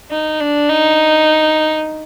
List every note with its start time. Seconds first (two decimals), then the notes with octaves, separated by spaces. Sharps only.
0.11 D#4
0.40 D4
0.70 D#4